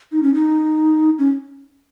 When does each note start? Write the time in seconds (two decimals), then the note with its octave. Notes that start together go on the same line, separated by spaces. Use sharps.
0.12 D#4
0.23 C#4
0.34 D#4
1.19 C#4